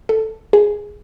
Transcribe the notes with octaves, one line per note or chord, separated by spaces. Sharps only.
A4
G#4